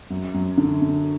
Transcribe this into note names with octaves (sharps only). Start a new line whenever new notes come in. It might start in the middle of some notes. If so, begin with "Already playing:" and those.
F#2
F#2
D3
D3